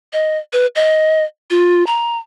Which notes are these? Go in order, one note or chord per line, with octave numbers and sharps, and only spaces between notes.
D#5
B4
D#5
F4
A#5